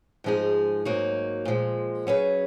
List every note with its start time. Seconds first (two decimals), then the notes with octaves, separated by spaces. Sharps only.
0.24 G#2 F3 G#3 D#4 G#4
0.85 G#2 F#3 A#3 D#4 F#4
1.45 A#2 F3 G#3
2.07 F#3 C#4 G#4 B4